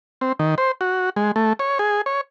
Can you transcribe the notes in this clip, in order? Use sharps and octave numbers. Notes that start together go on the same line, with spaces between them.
C4
D#3
C5
F#4
G#3
A3
C#5
G#4
C#5